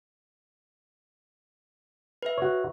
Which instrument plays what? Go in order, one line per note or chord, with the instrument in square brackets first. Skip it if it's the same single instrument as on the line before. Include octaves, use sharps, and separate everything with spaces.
[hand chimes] B4 E5
[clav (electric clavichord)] F#4 C#5